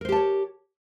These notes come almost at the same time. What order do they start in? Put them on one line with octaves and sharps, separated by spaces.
A#4 C5 G4 A5 C#5